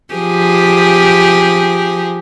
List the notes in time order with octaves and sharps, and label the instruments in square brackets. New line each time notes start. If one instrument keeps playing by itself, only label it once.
[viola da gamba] F3 G4 G#4